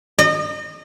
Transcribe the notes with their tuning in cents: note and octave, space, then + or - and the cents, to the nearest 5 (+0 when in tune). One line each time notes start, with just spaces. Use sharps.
D#5 -30